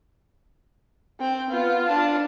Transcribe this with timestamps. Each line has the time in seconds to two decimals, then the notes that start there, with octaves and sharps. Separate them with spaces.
1.20 C4 G5
1.50 B3 F4
1.88 D4 A5